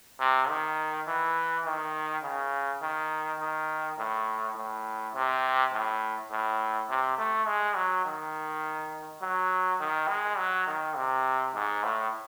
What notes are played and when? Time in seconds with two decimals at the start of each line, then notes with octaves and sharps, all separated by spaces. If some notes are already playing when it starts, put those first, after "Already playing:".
0.20 C3
0.49 D#3
1.07 E3
1.65 D#3
2.23 C#3
2.82 D#3
3.39 D#3
3.98 A2
4.56 A2
5.14 C3
5.73 A2
6.31 A2
6.89 C3
7.18 A3
7.47 G#3
7.76 F#3
8.05 D#3
9.22 F#3
9.80 D#3
10.08 G#3
10.37 F#3
10.67 D#3
10.96 C3
11.54 G#2
11.83 A2